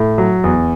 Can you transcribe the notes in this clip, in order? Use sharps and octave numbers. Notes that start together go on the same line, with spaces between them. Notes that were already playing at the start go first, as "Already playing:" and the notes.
Already playing: A2
F#3
E2